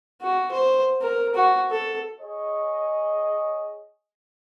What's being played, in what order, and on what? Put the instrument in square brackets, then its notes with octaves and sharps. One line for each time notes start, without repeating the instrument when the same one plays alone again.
[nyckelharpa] F#4
C5
A#4
F#4
A4
[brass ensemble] G#4 C#5 D#5